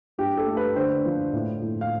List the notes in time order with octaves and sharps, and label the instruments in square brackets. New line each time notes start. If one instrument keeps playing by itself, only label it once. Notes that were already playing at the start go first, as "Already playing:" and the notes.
[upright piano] G2 G4
A4
A3
B4
D3 C5
F3
A2
A2
F5